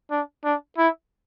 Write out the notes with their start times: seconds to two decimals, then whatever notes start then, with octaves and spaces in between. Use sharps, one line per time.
0.11 D4
0.44 D4
0.78 E4